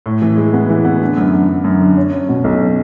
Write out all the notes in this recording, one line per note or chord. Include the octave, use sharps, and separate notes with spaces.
A2
E3
G#3
B3
E3
B3
D3
F#2
D3
D3
F#2
D3
C#4
C#4
B2
B1
C#4